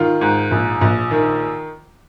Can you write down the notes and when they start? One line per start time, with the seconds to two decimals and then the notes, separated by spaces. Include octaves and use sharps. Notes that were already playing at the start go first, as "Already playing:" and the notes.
Already playing: D#3 F4
0.21 G#2
0.51 A#1
0.81 A#1
1.11 D#3